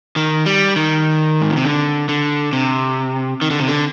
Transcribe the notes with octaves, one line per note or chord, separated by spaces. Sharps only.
D#3
G3
D#3
G#2
A#2
C3
D3
D3
C3
D#3
D3
C3
D3